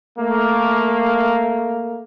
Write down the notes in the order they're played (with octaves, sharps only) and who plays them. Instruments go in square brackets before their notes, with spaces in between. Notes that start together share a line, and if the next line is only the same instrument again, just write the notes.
[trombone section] A3 A#3